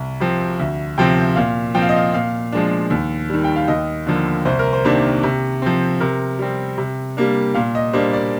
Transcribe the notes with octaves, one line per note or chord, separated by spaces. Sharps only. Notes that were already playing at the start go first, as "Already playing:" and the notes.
Already playing: C2
C3 F3 C4
D2
C3 F3 C4 G5
A#2 F5
F3 C4 F5 G5
D#5
F5
A#2 F5
F3 G#3 D4
D#2
D#3 G3
G5
F5
D#2 D#5
D3 F3 A#3
C2 C5
A#4
C5
C3 D#3 A#3 D4
C3
F3 C4
C3 A#4
G3 C4
C3
G3 A#3 D4
A#2 F5
D#5
G3 A#3 D4 C5
D5